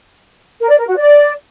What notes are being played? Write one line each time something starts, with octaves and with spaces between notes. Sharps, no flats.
A#4
D5
A#4
F#4
D5